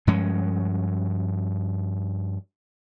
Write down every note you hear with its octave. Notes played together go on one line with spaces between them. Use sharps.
G2 F3 G#3 C#4